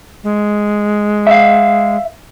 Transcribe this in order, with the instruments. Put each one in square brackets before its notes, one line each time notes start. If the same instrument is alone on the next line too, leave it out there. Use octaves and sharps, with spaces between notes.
[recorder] G#3
[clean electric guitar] E5 F5